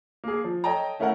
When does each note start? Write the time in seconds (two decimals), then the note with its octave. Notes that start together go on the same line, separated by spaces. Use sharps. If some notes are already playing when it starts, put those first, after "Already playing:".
0.24 A#3 G#4
0.44 F3
0.64 A4 C#5 D#5 G5 A5 A#5
0.99 A3 C#4 E4 A4 A#4 F#5